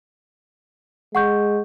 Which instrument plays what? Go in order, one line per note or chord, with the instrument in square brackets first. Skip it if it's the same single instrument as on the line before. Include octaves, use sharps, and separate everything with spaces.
[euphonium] G#3 [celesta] F#5 C#6 G6